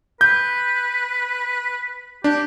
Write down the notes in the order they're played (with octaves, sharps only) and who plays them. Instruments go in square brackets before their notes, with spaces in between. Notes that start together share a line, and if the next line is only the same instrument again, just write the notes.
[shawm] B4 [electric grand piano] G6
[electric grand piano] D4 [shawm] G4